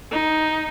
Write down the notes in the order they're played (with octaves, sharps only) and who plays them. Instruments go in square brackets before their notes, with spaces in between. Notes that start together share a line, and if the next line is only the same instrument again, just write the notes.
[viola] D#4